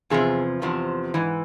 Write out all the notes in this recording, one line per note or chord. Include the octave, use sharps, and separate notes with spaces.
E2 C3 F3 G#4
E2 C3 F3
G#2 E3